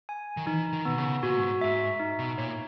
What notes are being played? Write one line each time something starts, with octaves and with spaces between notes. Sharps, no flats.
G#5
D#3
E3 D#4
D#3
B2 B3
C#3
A#2 F#4
G#2
G#2 E5
D#4
B2
A#2 C#5